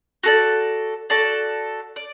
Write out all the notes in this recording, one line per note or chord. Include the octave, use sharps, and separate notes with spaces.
F#4 A4 D5
F#4 A4 D5
D5